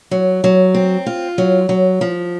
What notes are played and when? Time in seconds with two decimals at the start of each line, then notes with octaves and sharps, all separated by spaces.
0.11 F#3
0.44 F#3
0.74 C4
1.06 F4
1.38 F#3
1.69 F#3
2.01 F3